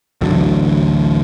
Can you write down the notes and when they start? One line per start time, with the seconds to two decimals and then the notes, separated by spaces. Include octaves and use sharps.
0.21 A1 D2 D3 F#3